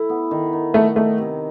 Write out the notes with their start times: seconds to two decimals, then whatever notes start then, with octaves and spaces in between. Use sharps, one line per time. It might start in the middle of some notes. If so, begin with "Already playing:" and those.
Already playing: E4 A4
0.09 B3
0.31 D#3
0.53 D#3
0.74 A3 D#4
0.96 A3 D#4
1.18 C3